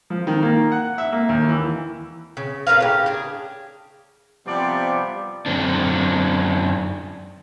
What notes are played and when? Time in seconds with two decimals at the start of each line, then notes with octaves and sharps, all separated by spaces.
0.10 F3
0.27 D#3
0.42 A#3
0.72 F#5
0.98 E5
1.12 A#3
1.29 D#2
1.49 E3
2.37 C#3
2.67 A2 A#4 B4 F5
2.81 C#3 G4
3.06 D4 G#4
4.46 C3 F3 G3 B3 D5
5.46 F#2 D3 C4 D4